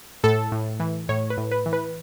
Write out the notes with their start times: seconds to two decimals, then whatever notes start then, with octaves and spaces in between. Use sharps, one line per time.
0.24 A2 A4
0.52 A2
0.80 E3
1.09 A2 C#5
1.30 B4
1.37 A2
1.51 B4
1.66 E3
1.73 B4